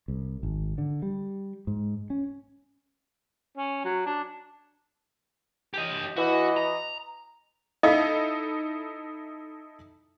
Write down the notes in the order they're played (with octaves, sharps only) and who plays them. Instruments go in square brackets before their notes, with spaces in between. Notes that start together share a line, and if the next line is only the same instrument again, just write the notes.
[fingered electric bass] C2
G#1
D3
G3
G#2
C#4
[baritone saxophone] C#4
F#3
D4
[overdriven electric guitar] G4 D#5
[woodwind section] E3 D#5 [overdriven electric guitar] F#4
[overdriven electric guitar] A#5
[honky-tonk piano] D#4 E4 A4 [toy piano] D#5 F5